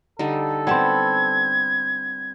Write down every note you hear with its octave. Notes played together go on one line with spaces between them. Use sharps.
D3 G3 D#4 A4
G3 B3 C4 F#5 A5 G#6